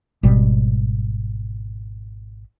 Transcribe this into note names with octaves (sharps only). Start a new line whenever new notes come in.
G#1 B2 G3